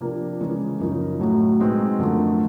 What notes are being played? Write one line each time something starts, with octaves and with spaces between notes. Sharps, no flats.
C3 F3 A#3 D4
C#3 E3 G#3 C#4
F#2 C#3 F3 A#3 D#4
A2 F#3 A3
B2 G#3 C4 D#4
F#2 D3 F3 A3